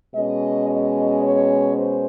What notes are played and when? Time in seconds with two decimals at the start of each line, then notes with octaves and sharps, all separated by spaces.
0.13 B2 G#3 C#4 D#5
0.67 D#5
1.20 C#5
1.75 C5